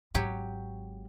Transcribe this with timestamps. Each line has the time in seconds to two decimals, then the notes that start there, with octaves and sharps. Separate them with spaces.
0.14 G#1 G#2 F#3 G4 C#5